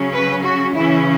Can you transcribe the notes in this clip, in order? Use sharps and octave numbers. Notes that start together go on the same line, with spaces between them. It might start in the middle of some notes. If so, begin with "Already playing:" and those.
Already playing: C#3 F#3 C#4
B4
F#4
C#3 E3 C#4 E4